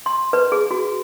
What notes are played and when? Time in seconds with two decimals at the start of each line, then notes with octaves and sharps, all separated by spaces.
0.06 C6
0.33 B4
0.52 G#4
0.71 F#4